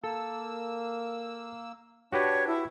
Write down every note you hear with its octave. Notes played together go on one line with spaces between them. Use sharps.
A#3 A4 E6
D4 F#4 G4 B4 C#5
E4